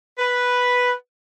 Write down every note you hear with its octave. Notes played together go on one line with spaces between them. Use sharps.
B4